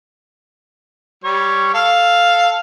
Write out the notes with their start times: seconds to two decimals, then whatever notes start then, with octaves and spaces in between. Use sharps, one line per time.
1.24 G3 C#5
1.74 A4 F5